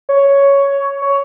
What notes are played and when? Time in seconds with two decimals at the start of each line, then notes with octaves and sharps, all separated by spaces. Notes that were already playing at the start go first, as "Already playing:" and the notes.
0.09 C#5
1.02 C#5